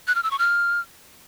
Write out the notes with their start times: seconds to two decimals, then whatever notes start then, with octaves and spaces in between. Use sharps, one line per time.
0.07 F#6
0.15 F6
0.23 E6
0.31 C#6
0.39 F6